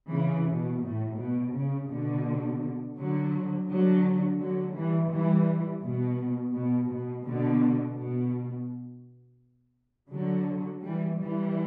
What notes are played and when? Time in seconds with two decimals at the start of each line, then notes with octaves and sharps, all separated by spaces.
0.11 C#3 E3
0.47 B2
0.82 A2
1.18 B2
1.55 C#3
1.90 B2 D3
2.97 D3 F#3
3.69 D3 F#3
4.40 D3 F#3
4.76 E3 G3
5.11 E3 G3
5.83 B2
6.54 B2
6.90 B2
7.25 B2 D3
7.97 B2
10.11 D3 F#3
10.83 E3 G3
11.19 E3 G3